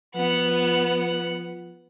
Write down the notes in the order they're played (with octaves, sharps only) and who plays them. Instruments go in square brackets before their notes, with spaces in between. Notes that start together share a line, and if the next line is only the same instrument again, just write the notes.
[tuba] F3 [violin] B3 [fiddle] F#5